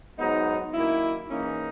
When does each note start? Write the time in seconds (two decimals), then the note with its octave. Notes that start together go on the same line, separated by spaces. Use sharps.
0.18 G#2 F#3 B3 D#4
0.74 F#2 D#3 A#3 E4
1.30 G#2 E3 A#3 C#4 D#4